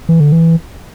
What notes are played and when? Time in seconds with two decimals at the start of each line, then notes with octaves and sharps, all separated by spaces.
0.09 E3
0.20 D3
0.32 E3